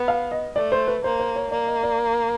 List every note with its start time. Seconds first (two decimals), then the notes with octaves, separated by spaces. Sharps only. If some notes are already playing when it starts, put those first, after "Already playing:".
Already playing: B3
0.08 F5
0.31 D#5
0.56 A3 D5
0.72 C5
0.88 B4
1.04 A#3 C5
1.20 C5
1.36 C#5
1.51 A#3 D5
1.67 D#5
1.83 D5